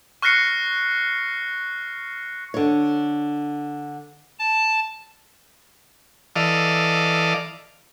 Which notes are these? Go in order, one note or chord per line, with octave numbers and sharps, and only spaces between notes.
C#6 F6 F#6 A#6 C7 C#7
D3 C#5
A5
E3 A4 D5 D#5 F5